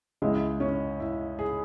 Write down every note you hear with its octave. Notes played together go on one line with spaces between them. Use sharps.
C#2 C#3 G#3 E4
C#4
E4
G#4